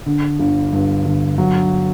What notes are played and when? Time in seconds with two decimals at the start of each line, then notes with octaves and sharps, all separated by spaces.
0.06 D3
0.39 G1
0.73 G2
1.05 G1
1.38 F#3